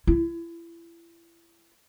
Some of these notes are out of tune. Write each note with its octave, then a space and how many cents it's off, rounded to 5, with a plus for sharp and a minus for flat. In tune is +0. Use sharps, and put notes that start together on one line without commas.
E4 +35